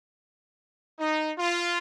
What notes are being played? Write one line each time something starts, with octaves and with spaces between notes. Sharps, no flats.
D#4
F4